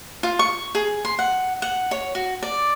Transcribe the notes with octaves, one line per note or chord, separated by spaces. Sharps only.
F4
C#6
G#4
C6
F#5
F#5
C#5
F#4
D5